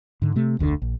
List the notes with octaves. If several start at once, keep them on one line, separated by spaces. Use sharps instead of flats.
G#2 D3
C3 A3
F1 D2 G#2 D3
A#1